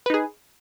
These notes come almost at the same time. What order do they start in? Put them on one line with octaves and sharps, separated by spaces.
B4 D#4 G#4